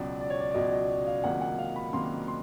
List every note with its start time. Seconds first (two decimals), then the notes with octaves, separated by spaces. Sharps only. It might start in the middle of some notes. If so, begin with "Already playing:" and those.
Already playing: C#2 B2 F#3 D5
0.21 D5
0.30 C#5
0.40 D5
0.51 D5
0.54 C#2 B2 F#3 D#5
0.72 D#5
1.06 F5
1.24 C#2 C3 D#3 F#3 A#3 F#5
1.42 F#5
1.58 F5
1.76 B5
1.93 C#2 C3 D#3 F#3 A#3 C6
2.28 C6